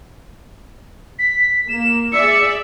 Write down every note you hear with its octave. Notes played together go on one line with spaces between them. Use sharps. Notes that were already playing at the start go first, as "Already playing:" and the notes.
B6
A#3 E7
G#4 D5 E5 C#7